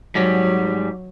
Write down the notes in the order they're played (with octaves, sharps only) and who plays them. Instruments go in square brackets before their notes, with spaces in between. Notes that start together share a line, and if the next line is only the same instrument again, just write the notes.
[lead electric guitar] G#2 G3 [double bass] F#3